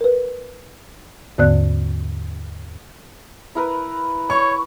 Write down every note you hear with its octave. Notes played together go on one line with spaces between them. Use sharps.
A#4 B4
D#2 G#2 D3 B3 D5 F#6
E4 A#4 B4
C#5 C#6